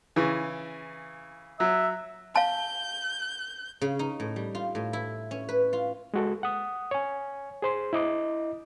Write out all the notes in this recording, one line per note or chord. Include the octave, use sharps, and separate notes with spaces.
C#3 E3
F#3 E5
F5 A5 G6
C#3
D#4
A2
G3
F4
A2
E4
C#4
B4
F4
G#3 F#4 A4
F#5 D#6
C#5 G#5
G#4 C5 C6
E4 D#5 D6